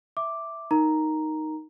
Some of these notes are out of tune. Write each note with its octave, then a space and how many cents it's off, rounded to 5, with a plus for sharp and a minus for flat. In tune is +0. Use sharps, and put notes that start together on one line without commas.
E5 +0 D6 +0
D#4 +0 A#4 +0 A#5 +0